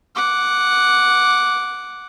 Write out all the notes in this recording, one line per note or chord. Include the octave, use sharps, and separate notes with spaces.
F#5 D6